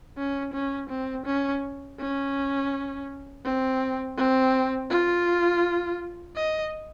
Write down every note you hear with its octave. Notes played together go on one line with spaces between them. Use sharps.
C#4
C#4
C4
C#4
C#4
C4
C4
F4
D#5